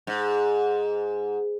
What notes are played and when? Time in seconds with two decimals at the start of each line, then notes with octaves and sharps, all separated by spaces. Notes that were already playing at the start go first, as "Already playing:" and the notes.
0.07 G#2